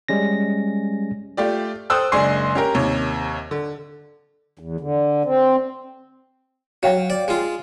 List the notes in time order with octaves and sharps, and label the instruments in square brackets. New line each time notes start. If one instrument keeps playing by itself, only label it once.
[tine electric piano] G3 G#3 C#4 A#6
[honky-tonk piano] A3 F4 G4 D5
A4 C5 G5 D#6 E6 F#6
F#1 G#3 D4 G#5 C6 C7
C#4 G4 A#4
D#2 C3 C#5
D3
[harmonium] E2
D3
C4
[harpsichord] F#3 [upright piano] C#5 F5 G5
[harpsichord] D5
G#3 F4